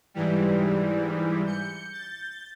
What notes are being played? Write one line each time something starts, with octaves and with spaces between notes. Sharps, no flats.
G#2 E3 G3
G6 C#7
G6 A6